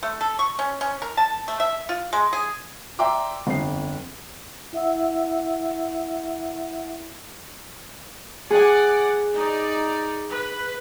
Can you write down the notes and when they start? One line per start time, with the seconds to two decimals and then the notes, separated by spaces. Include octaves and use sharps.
0.03 A3
0.21 A4
0.39 C#6
0.59 C#4
0.81 C#4
1.02 A#4
1.17 A5
1.48 A3
1.60 E5
1.89 F4
2.13 G#3
2.33 G#4
2.99 D5 E5 G5 A#5 C6 D6
3.47 G1 F2 C7
4.73 E4 E5 F#5 E6
8.51 G#4 D5 F#5 G#5
9.34 D#4 D5
10.30 B4